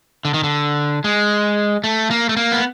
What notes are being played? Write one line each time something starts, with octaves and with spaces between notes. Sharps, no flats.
D3
D#3
D3
G#3
A3
A#3
A3
A#3
B3